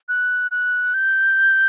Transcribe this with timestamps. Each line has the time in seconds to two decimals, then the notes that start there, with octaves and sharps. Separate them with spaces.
0.09 F#6
0.51 F#6
0.94 G6